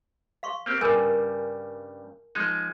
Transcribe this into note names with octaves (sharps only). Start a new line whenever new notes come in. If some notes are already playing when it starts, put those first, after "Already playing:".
F5 C6 C#6
A#3 C4 G4
G2 C#3 G3 G#4 A#4 G#5
F3 G#3 D#4